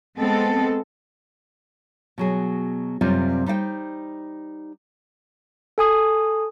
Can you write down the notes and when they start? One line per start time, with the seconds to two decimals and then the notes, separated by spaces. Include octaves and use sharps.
0.18 G#3 B3 C4 A4
2.18 B2 F#3 G#4
3.01 F#2 C3 G3 C4 F4 D5
3.46 G3 D#4 C5 F5 G5
5.78 A4 G#5 D#6